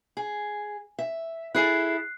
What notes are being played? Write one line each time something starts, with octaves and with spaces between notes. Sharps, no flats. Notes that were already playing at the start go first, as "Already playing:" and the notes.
G#4
E5
E4 G#4 A4 F#6 C7